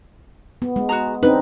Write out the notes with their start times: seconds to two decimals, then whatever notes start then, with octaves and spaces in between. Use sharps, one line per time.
0.62 B3
0.76 G#3
0.89 F#4 G#4 A#5
1.23 C4 D4 D#4 B4